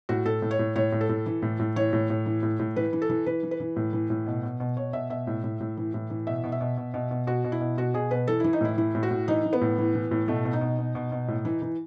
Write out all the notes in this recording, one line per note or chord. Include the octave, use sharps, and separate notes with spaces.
A2 F#4
A2 A4
A2
C#5
A2
A2 C#5
A2
A4
A2
E3
A2
A2
E3 C#5
A2
A2
E3
A2
A2
E3 B4
E3
A4
E3
E3 B4
E3
B4
E3
A2
E3
A2
B2
B2
B2
B2 C#5
B2 E5
B2 E5
A2
A2
A2
E3
A2
E3
B2 E5
B2
E5
B2
B2
B2
B2
B2 F#4
B2
E4
B2
B2 F#4
B2 G#4
B2 B4
E3 A4
E3 E4
D#4
A2 E4
E3 E4
A2
F#4
A2
E3 D#4
E3
B3
A2
E3
E3
A2
B2 A3
B2
D#4
B2
B2
B2
B2
A2
E3
E3